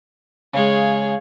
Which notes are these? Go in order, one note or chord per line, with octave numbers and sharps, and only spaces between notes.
C#3 G#3 G#4 C#5 F5